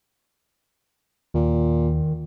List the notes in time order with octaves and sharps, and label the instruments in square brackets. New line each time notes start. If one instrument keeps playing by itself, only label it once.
[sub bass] D#2 [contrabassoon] A#2 [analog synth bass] D#3